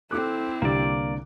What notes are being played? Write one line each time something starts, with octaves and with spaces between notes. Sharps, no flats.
C4 E4 A4 D6 F#6
C2 D3 A#3 D5